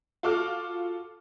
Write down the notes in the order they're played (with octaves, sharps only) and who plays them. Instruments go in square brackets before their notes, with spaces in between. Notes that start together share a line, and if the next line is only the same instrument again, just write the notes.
[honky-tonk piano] F4 F#4 A4 C#6 D6 F6